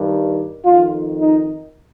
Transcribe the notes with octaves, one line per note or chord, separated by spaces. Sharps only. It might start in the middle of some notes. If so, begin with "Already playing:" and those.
Already playing: G2 D#3
F2 D#3 F4
D#4